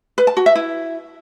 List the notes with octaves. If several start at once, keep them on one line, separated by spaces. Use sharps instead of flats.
B4
A5
F#4
E5
E4